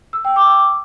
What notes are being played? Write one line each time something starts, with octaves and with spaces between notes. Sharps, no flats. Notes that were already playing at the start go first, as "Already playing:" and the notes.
E6
G5
D6